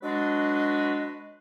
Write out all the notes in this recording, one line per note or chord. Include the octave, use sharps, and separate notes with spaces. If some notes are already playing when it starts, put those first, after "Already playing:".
F#3 G#3 D4 F#4 B4 D#5